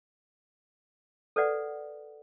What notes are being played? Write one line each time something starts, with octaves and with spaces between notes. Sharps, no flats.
A4 B4 D5 F#5